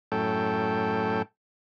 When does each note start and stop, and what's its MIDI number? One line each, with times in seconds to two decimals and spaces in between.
0.12 1.22 42
0.12 1.22 45
0.12 1.22 69
0.12 1.22 79